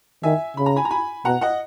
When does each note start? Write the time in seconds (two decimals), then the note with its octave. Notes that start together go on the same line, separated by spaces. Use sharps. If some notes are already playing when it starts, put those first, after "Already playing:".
0.23 D#3 E5 G#5
0.57 C#3 B5
0.66 A#5
0.76 G#5 B5
0.85 A#5
0.90 G#5 B5
1.25 B2 F#5 A#5
1.41 D#5 F#5